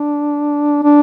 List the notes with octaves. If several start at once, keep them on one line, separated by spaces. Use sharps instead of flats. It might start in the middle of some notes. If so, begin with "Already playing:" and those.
Already playing: D4
D4